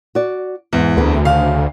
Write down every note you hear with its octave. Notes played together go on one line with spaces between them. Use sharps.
F#4 D5
E2 G#2 E3
D2 C4 G#4 B4
C#3 F5